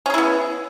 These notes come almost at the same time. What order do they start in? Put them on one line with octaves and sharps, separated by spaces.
C#4 G#4 E4 B3